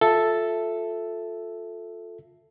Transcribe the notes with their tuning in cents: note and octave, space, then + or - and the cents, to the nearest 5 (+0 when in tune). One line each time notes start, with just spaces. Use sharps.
F4 +25 A4 +0 E5 +5